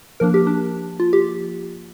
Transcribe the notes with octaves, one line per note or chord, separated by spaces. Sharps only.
F3 A#3 D4 A#4
G4
D4
F4
G4